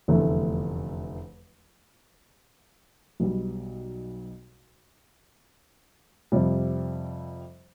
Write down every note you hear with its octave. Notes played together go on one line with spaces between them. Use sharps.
F1 E2 D3 A3
B1 B2 G3
F2 C3 G3